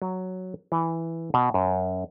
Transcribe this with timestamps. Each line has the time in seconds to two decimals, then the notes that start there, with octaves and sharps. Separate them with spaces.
0.02 F#3
0.72 E3
1.34 B2
1.54 F#2